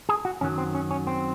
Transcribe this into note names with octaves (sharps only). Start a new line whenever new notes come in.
G#4
F#4
F#2 D#3 F#3 C#4
C4
C#4
C#4
C4